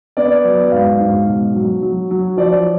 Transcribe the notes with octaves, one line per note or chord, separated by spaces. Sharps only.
B3 D5
F#3
G#2 F5
G#2
B2
F#3
F#3
F#3
F3 D5
C#5